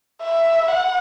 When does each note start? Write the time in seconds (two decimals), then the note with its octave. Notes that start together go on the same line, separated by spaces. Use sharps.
0.22 E5
0.68 F#5